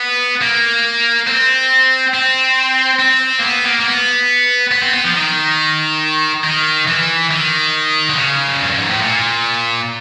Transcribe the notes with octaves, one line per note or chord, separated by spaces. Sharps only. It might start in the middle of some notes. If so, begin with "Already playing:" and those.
Already playing: B3
A#3
C4
C4
C4
A#3
B3
A#3
A#3
B3
B3
C4
B3
F3
D#3
D#3
E3
D#3
D3
C#3
F#2
G2
G#2
A2
A#2